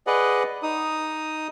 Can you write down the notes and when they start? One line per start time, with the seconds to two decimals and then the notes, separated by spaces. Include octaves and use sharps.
0.07 G#4 B4 D5 D#5 F#5
0.63 D#4 D#6